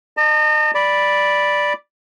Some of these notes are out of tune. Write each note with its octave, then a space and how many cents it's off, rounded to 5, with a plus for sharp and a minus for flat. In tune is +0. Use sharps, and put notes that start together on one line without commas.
D#5 -35 A5 +30
D5 +0 B5 -5